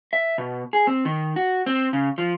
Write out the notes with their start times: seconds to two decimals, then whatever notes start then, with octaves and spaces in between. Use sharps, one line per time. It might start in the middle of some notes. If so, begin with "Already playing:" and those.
0.13 E5
0.38 B2
0.73 G#4
0.87 C4
1.05 D#3
1.36 F#4
1.66 C4
1.93 C#3
2.18 F3